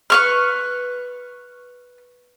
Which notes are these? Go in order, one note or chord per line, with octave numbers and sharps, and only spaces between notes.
B4 C#6 F6